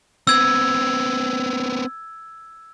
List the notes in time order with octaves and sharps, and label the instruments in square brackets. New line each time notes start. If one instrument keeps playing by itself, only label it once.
[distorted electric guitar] B3 C4 [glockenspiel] E6 G#6